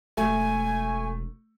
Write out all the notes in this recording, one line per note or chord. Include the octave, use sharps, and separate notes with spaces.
E1 A3 G#5